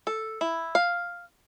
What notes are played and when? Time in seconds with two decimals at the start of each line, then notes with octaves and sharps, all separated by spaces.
0.07 A4
0.41 E4
0.75 F5